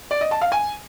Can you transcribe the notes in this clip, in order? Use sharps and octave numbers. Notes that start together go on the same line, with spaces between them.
D5
D#5
A5
F5
G#5